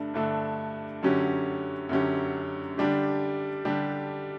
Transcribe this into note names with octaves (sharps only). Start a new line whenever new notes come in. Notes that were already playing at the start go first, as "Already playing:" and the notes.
Already playing: G2 D3 A3 D4
G2 D3 A3 D4 A4
F#2 D3 F#3 C#4 G4
F#2 D3 F#3 C#4 G4
D3 G3 D4 G4
D3 G3 D4 G4